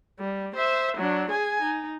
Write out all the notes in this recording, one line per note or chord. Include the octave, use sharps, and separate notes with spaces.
G3
C5 E5
F#3 D4
G#4 G#5
D#4